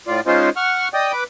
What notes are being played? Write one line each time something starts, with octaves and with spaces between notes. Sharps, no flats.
A2 F4 D5
G#3 C#4 D#4 F4 C5
F#5 C#6 F6
D5 D#5 G5 D#6
B4 D6